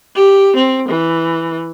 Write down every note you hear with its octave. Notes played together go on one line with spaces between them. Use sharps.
G4
C4
E3